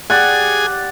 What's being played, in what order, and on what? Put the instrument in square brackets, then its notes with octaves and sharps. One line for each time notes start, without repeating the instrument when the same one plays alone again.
[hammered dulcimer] G4 D5 F#5 [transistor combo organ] G#4